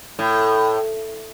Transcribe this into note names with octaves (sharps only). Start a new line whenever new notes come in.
A2